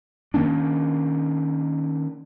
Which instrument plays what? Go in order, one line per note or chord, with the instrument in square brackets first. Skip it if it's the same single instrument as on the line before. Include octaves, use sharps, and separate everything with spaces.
[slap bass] D#3 A#3 C#4 D4